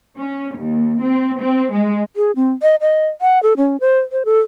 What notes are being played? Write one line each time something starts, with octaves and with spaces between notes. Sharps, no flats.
C#4
D#2
C4
C4
G#3
G#4
C4
D#5
D#5
F#5
A4
C#4
C5
C5
A4